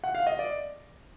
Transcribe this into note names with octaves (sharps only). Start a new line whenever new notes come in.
F#5
F5
D#5
D5